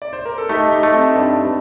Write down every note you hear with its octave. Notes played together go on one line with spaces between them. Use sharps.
D5
C5
A#4
A4
A3 D#4 G4
D#4 G4
A3
C4 D#4
G2 D4